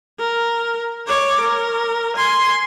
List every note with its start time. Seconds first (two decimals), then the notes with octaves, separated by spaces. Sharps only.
0.19 A#4
1.07 C#5 D6
1.41 A#4
2.17 G#5 C6